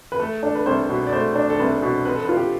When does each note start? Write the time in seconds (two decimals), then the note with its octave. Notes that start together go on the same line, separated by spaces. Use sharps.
0.12 B4
0.19 A3 A4
0.43 D4 A4
0.55 B4
0.66 C2 C5
0.89 B2
1.07 D5
1.12 A3 C5
1.35 D4
1.50 A4
1.59 C2 B4
1.82 B2
2.05 C4 B4
2.15 A4
2.25 B4
2.29 F4
2.37 G4